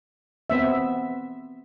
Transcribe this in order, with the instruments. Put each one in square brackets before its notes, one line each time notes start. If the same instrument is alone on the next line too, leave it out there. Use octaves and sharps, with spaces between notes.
[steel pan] B3 C4 E5